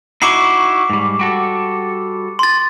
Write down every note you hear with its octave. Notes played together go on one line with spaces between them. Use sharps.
D#4 E4 F#4 C#6 D6 C7
G#2 G3
G3 F#4 A4
C6 A6